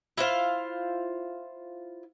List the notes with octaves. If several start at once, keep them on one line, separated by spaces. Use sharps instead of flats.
E4 F4 C5 F5